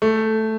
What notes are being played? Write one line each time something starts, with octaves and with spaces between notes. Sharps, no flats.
A3